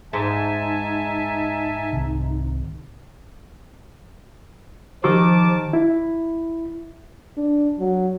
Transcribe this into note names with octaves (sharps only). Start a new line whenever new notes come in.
G#2 D#4 E5 G#5 A5
C2 C3 D#3
D#3 F3 G4 A5 D6 E6
E4
D4
F#3